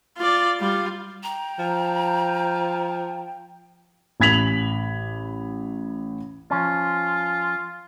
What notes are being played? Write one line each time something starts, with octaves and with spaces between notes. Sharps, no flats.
F4 D5
G3 F4
G5 A#5
F3
A1 B5 G#6 B6 F7 F#7
F3 C#4 F4